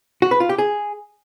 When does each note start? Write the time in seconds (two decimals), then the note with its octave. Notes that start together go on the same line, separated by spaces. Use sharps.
0.22 F#4
0.31 B4
0.40 F4
0.49 G4
0.58 G#4